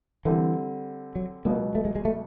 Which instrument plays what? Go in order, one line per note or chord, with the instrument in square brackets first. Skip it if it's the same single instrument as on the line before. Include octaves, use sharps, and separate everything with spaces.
[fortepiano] D3 G3 C4 [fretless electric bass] E3
[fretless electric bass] F#3
[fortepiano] C#2 B2 F#3 B3 [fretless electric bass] A#3
[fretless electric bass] A3
G#3
G#3
A3